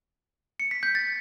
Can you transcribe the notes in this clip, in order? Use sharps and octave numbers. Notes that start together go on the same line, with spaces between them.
C#7
B6
G6
A6